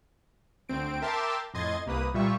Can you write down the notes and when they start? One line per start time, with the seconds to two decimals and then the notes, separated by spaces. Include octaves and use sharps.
0.69 D2 C4 D7
1.02 A#4 E5 G5 A5 C6 D6
1.54 F2 A2 D#5 C6 G#6 A6
1.86 C2 A#3 B4 D#6
2.14 A#2 G3 F4 E5 C#6